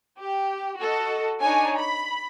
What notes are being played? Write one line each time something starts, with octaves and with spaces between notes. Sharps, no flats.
G4
F#4 A4 D#5
D4 D#4 C#5 G#5
B5